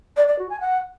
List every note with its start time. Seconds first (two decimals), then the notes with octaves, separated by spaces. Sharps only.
0.17 D5
0.28 D5
0.39 F#4
0.50 G#5
0.60 F#5